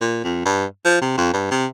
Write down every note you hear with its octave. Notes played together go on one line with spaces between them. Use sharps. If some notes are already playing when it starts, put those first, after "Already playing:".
A#2
F2
G2
F3
C3
F2
G2
C3